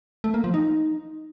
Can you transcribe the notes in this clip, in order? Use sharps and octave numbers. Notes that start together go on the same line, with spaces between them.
A3
A#3
F3
D#4